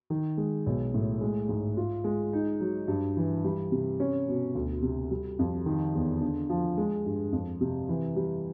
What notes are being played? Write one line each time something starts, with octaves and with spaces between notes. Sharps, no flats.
D#3
G#3
B1
A2
G#3
G#2
F4
G#3
D#4
F#3
G2
E3
G3
C3
C#4
B2
D2
C3
G3
F2
D#3
E2
D3
F3
G#3
G2
F2
C3
E3
G3